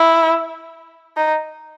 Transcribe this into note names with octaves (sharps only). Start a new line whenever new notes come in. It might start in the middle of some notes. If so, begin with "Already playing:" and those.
Already playing: E4
D#4